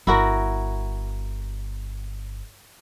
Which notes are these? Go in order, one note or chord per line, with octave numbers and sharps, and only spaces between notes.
G1 E4 F#4 A#4